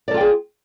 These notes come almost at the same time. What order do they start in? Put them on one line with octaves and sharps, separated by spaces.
D5 A4 F4 G5 G#4